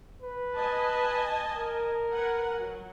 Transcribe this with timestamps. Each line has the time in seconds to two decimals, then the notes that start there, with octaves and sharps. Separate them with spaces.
0.22 B4
0.56 D#5 G#5 A5
1.56 A#4
2.12 B4 F#5 G#5
2.58 F#3